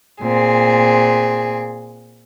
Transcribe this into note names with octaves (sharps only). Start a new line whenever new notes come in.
A#2 C4 G#4